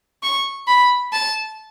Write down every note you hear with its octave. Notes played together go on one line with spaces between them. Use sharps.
C#6
B5
A5